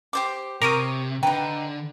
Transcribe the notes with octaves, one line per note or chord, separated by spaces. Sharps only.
G4 C5 D6
C3 A#4 C5 C#5 D6 D#6
D3 D#4 B4 G5 A#5